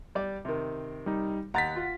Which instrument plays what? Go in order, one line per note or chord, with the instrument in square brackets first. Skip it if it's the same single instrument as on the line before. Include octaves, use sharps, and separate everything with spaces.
[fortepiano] G3 D5
C3 D#3
[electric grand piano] G3 D#4
[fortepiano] D#2 A#5 [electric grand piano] F#5 A6 B6
[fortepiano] F4